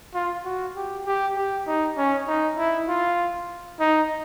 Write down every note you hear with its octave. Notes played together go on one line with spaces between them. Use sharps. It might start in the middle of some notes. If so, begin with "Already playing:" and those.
F4
F#4
G4
G4
G4
D#4
C#4
D#4
E4
F4
D#4